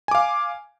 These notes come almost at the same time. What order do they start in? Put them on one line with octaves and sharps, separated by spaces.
G#5 D6 F5